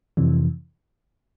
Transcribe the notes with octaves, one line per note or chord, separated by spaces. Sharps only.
F2 C3 E3